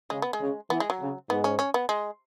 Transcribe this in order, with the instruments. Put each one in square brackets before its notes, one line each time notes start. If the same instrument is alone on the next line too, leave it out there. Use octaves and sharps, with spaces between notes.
[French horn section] C#3 [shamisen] G#3
[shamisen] B3
G#3
[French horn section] C#3
[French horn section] E3 [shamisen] B3
[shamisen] G#3
F#3
[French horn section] C#3
[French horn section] G#2 [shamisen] B3
[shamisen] C#4
C#4
B3
G#3